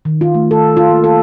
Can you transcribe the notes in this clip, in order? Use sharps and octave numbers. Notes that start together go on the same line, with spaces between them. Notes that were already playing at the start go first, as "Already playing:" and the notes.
D#3
F4
A3
A4
F4
A#3
A4